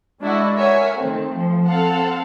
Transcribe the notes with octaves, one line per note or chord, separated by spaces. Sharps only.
G#3 D4 E4 F#4 D#5
A#4 C#5 E5 F#5 G#5
D#3 A3 C4
F3
C4 A4 F5 F#5